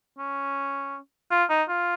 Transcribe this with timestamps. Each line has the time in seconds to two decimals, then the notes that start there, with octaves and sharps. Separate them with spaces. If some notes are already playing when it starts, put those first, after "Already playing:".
0.19 C#4
1.31 F4
1.50 D#4
1.69 F4